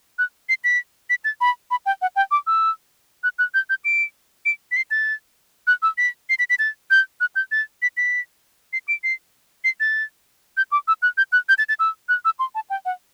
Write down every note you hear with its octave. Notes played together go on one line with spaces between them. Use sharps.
F#6
C7
B6
B6
A6
B5
B5
G5
F#5
G5
D6
E6
F#6
F#6
G6
G6
D7
D7
B6
C7
A6
F#6
E6
B6
C7
B6
B6
A6
G6
F#6
G6
A6
B6
B6
C7
D7
C7
C7
A6
G6
D6
E6
F#6
G6
F#6
G6
A6
A6
E6
F#6
E6
C6
A5
G5
F#5